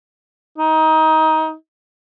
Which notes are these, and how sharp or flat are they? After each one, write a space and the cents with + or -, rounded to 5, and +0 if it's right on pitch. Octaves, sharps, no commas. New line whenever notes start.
D#4 +20